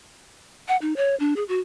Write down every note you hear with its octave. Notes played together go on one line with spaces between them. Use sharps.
F#5
D#4
C#5
D4
G#4
F#4